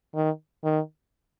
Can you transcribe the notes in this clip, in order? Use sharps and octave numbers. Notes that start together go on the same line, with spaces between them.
D#3
D#3